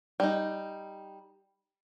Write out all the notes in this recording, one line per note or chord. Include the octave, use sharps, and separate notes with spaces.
G3 D#4